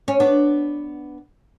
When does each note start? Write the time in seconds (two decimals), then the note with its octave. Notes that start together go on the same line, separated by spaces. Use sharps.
0.08 C#4
0.20 B3 D4